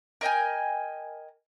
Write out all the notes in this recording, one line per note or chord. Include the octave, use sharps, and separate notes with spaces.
A#4 D#5 G5 G#5